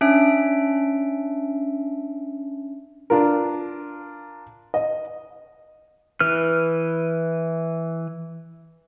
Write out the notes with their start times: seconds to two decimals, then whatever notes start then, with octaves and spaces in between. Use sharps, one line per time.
0.01 C#4 D4 E5 D7
3.10 D4 F4 A#4
4.74 D#5
6.20 E3 B4 F6